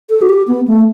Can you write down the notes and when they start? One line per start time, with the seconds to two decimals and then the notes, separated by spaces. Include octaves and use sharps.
0.10 A4
0.22 F#4
0.29 G4
0.48 B3
0.68 A3